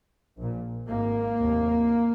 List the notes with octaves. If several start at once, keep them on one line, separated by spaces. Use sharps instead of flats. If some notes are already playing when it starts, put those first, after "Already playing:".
A#1 A#2
G#1 G#2 A#3
F1 D#2